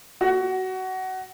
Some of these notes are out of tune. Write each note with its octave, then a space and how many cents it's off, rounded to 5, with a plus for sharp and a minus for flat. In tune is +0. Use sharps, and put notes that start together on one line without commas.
F#4 +20